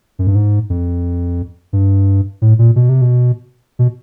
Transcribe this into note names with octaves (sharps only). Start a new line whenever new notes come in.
F#2
G2
G#2
F2
G2
A2
A#2
B2
C3
B2
B2